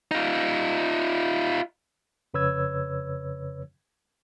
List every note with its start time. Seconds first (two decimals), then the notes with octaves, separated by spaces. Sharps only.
0.11 D#4 F4
2.34 F2 C#3 B4 C#5 E6 G#6